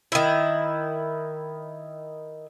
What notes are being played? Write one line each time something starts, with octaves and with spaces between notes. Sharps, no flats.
D#3 E4